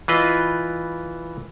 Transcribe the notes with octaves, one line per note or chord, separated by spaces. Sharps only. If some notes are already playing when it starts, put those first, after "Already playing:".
E3 F4 B4 D#5